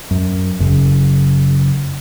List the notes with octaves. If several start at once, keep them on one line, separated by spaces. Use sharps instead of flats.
F#2
F#1 F#2 C#3